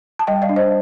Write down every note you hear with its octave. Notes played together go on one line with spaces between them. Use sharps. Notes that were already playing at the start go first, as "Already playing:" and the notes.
A5
G3 D#5 G5
D5 F5
D4
C5 D#5